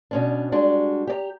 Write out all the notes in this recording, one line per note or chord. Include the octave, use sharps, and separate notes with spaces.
B2 C#4 D4
G3 G#3 D4 F#4
G4 D5 A#5